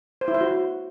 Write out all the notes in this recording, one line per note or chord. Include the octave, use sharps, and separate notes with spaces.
C5
E4
C5
F#4